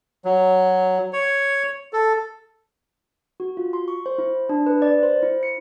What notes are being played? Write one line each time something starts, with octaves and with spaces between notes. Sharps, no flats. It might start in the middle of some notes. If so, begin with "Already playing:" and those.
F#3
C#5
A4
F#4
F4
C6
C#6
C5
E4
D4
B4
D5
C5
E4
C#7